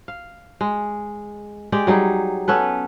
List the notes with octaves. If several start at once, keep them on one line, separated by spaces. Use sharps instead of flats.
F5
G#3
G#3 G4 D5
F#3 G3 D#4 G#4
B3 C#4 A4 B4